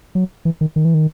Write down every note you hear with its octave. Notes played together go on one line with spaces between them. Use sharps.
F#3
E3
D#3
D#3
E3
D#3